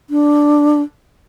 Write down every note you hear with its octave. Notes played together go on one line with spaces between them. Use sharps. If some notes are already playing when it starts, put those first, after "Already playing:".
D4